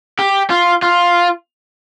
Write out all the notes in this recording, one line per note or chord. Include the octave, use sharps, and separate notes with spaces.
G4
F4
F4